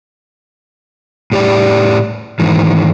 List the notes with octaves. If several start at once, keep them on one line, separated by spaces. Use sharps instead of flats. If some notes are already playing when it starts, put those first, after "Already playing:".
A2 G4 D5
G#2 D#3 E3